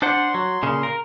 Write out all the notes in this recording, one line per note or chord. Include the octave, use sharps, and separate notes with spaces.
D4 C5 F#5 C6
F#3
A#2 C#3
A#4